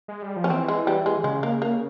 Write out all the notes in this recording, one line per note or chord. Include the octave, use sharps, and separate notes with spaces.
G#3
G3
F3
C#4
E3 C4
G#3
G3
G#3
C#3 G#3
A#3
A#3